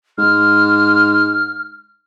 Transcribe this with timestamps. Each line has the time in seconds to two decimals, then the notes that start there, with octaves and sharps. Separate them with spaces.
0.18 G#2 F6